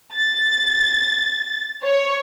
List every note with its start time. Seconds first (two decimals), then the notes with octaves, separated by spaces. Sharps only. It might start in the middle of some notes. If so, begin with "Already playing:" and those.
0.15 A6
1.84 C#5